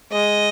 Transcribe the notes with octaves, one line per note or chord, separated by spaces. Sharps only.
G#3 D#5